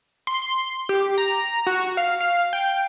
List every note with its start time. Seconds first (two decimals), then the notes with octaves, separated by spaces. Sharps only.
0.27 C6
0.42 C6
0.89 G4
1.18 A#5
1.67 F#4
1.97 F5
2.20 F5
2.53 G5